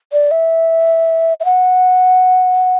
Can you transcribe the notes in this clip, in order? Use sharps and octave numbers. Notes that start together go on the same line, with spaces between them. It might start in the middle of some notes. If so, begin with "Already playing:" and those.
D5
E5
E5
F#5